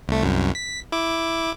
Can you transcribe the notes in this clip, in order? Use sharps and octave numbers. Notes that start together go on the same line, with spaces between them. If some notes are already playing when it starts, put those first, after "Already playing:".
C2 A3
C2 F#2
B6
E4 D6